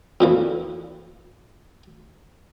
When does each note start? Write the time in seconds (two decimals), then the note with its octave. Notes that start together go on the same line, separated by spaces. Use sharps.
0.21 F2 A#2 E3